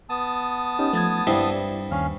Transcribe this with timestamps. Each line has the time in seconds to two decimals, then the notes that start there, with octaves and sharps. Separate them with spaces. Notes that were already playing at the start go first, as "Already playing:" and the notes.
0.10 B3 A5 D#6
0.79 C#4 D#4 G4
0.93 F3 A3 G#6 A6
1.27 G2 G3 C4 E4 D5
1.91 D#2 C#4 F5